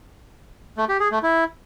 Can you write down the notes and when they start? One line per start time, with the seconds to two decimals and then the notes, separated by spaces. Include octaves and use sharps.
0.77 A3
0.89 G4
1.00 G#4
1.11 A3
1.23 E4